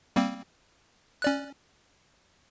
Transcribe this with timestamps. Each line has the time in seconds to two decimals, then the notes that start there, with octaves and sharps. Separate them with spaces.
0.16 G3 A#3 C4
1.22 C#4 D5 F#6